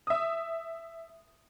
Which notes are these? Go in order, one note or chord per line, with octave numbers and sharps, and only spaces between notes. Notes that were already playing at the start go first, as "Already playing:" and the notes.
E5 D#6